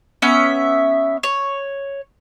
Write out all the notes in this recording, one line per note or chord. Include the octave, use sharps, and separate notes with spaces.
B3 C#4 E5
C#5